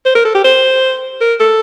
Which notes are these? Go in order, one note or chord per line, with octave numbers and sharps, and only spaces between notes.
C5
A#4
A4
G4
C5
A#4
A4